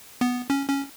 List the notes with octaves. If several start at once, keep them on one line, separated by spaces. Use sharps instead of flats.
B3
C#4
C#4